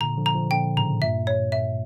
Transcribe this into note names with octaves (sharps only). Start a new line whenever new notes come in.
A#2 D3 A#5
D3 F3
A#5
D3 F3
A#2 D3 G5
A2 C#3 A#5
G2 A#2 E5
C#5
E5